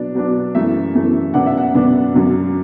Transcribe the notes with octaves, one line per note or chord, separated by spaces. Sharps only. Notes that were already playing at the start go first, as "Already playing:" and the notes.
Already playing: B2 F#3 B3 D4 D5
B2 F#3 B3 D4
F#2 E3 A3 E5
F#2 E3 A3
F#2 D3 B3 D4 F#5
E5
F#5
F#2 D3 B3 D4
F#2 D3 F#3